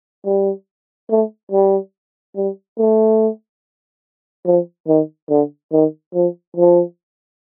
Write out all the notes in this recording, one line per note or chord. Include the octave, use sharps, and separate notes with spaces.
G3
A3
G3
G3
A3
F3
D#3
D3
D#3
F3
F3